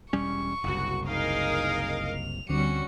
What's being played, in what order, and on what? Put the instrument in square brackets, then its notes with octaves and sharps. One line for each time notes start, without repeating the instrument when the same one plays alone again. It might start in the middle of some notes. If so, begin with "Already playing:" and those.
[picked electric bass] E1 G3 C#4 [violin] C#6
[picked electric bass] F#1 C2 [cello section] F#4
[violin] D#4 G#4 [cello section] A#4 D#5 F5
[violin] F7
[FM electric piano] D2 D3 C4 [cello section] G3 C#4 [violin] F#4 C#7